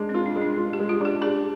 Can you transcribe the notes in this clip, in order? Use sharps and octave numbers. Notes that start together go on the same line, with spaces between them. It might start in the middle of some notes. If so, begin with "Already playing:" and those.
Already playing: G#3 D4
C4
F4
D4
G#3
D4
F4
G4
G#3
F4
D4 G4
D4 G#4